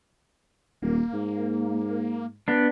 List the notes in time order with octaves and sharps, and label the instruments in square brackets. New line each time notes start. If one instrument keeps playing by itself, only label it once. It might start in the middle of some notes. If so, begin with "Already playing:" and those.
[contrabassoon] D#1 [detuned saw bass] A#3
[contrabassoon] G#2
[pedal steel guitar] B3 D4